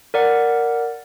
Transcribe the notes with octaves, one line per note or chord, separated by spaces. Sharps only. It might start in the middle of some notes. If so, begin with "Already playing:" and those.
A#4 D5 F#5